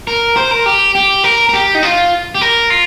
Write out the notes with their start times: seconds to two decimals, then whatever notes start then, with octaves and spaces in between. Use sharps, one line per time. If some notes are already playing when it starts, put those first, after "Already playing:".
0.07 A#4
0.37 C5
0.51 A#4
0.66 G4
0.95 G4
1.24 A#4
1.49 A#4
1.53 G4
1.75 D#4
1.83 F4
2.35 G4
2.41 A#4
2.70 F4